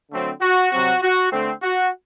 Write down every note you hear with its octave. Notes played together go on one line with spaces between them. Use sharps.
D3 F#3 A3 C4
F#4
C3 F#3 C4 F#4
F#4
D3 A3 C4
F#4